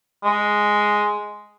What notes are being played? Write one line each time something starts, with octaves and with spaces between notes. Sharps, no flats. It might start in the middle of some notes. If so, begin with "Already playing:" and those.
G#3